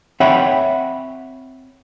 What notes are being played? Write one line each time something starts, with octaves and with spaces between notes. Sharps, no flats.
C4 C#5 E5 F#5 G5 B5